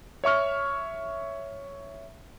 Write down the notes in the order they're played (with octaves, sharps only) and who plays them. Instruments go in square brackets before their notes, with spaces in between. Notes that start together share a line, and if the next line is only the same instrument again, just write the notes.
[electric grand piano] C#5 E5 C#6 F6